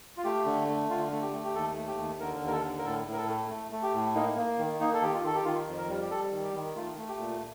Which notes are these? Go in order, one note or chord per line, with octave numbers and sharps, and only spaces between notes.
F4
A3 G4
D3
A3
D3 F4
A3
G4
A3
G4
D#2 A4
A3
G4
D#2
D3 A#4
D#2
A#4
A4
D3
A#4
A2 A4
A2
A#4
A4
A3
A3
A3
G4
A2
A#3 D#4
A#3
D#3
A#3 D#4
A4
D#3 G4
F4
D#3 A4
G4
D#3 F4
F2
A#4
G3
G4
G3 A4
D#3
G4
D#3
A3 F4
A3
G4
A#2